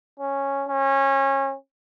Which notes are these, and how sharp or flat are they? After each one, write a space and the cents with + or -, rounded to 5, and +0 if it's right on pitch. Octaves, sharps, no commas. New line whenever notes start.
C#4 -5
C#4 -25